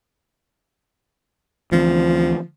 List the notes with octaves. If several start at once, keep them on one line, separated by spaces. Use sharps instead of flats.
D2 E3 F3 C4